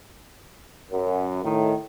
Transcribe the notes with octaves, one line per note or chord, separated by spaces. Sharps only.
F#2
A2 D#3